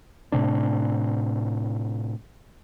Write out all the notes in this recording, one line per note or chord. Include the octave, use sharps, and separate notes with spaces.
A2 C3 D4